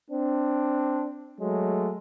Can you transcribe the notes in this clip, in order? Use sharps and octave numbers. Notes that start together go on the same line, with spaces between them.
C4 D4
F#3 G#3 A3